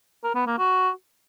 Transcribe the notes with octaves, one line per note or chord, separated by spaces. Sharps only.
A#4
B3
A#3
F#4